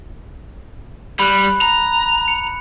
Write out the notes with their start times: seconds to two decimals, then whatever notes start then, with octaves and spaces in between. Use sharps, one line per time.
1.19 G3 B5 F#6
1.61 A#5
2.28 C#7